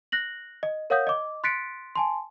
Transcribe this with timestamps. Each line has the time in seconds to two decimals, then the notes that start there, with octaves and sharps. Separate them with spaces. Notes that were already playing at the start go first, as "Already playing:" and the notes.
0.12 F#6 A#6 F#7
0.63 D#5
0.90 A#4 C#5 F5 F#5 D#6 G6
1.07 D#5 D6
1.44 C6 F#6 A6 B6 C#7 D7
1.96 G#5 A5 C6